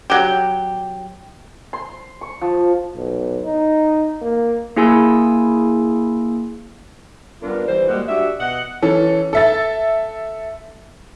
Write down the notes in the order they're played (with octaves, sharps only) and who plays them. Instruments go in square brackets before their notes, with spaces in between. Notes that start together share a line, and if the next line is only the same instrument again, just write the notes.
[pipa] F#3 G4
[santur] C6
C#6
F3
[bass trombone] B1
D#4
A#3
[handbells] A#3 E4 G#4 G#5 C6 E6
[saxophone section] G3 B3 D4 F4 A#4
E3 G3 C5
G3 G#3 A#3 F#4
D4 F#4 G4 E5
B2 D#5 F#5
[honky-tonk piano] E3 C#4 A4
A4 E5 A6